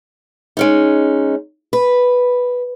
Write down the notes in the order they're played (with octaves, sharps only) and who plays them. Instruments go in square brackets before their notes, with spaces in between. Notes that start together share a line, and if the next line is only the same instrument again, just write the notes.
[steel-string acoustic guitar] G#3 C#4 D#4
B4